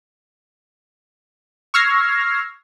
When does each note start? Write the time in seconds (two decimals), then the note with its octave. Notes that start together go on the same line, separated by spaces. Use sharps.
1.74 C#6 E6 F6 G#6 A#6 C7